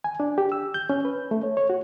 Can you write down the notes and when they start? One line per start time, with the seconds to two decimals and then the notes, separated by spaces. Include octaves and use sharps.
0.04 G#5
0.20 D4
0.38 G4
0.52 E6
0.74 G6
0.90 C#4
1.05 B4
1.31 A3
1.43 C#5
1.57 C#5
1.70 F#4